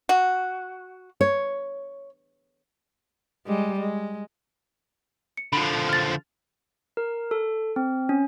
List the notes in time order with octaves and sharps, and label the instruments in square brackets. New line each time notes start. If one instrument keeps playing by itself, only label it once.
[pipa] F#4
[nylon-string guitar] C#5
[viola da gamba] G3 G#3
G#3
[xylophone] C#7
[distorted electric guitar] D3 F3 [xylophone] B5
[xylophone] F6 A6
[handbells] A#4
A4
C4
C#4